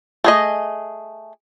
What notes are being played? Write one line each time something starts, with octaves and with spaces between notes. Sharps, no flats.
A3 G#4 D#5